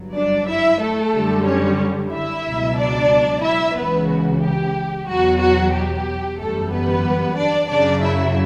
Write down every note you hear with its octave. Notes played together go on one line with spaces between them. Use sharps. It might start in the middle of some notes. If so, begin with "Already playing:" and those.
Already playing: G1 G2 F#3
D4 D5
E4 E5
A3 A4
F#2 D3 G3
C#4 C#5
E4 E5
C#2 B2 F#3
D4 D5
E4 E5
C#2 C#3 E3 B3 B4
F#4
G4
E2 B2 F#3 F#4
F#4
G4
G1 F#2 E3 G3 A3 A4
B3 B4
D4 D5
F#2 C#3 F#3 D4 D5
E4 E5